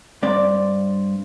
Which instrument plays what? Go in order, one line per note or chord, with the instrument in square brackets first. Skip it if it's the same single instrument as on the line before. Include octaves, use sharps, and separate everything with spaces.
[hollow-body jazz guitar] G2 C4 D5